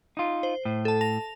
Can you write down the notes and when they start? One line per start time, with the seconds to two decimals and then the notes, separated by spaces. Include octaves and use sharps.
0.17 D#4 F4
0.43 C5
0.65 A2
0.85 A4 A5
1.01 A5 A#6 F7